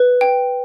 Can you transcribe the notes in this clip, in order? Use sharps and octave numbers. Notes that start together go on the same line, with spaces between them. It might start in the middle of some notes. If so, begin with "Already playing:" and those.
Already playing: B4
G5